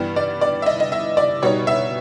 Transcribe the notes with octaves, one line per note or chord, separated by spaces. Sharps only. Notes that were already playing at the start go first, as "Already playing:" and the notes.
Already playing: G2 E3 G3 B3
D5
D5
E5
D#5
D#5
E5
D5
B2 G3 B3 D#4 C#5
E5